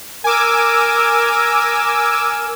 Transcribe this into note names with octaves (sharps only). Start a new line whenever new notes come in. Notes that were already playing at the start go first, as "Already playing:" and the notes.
A#4 G#5 D6 E6